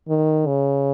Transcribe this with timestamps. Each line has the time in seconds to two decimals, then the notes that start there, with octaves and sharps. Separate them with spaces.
0.09 D#3
0.47 C#3